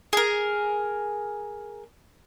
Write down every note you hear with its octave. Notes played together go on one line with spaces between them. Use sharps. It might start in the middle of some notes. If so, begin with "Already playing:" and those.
G#4 A#4